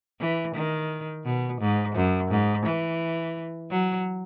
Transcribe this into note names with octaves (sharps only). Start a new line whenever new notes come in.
E3
D#3
B2
G#2
F#2
G#2
E3
F#3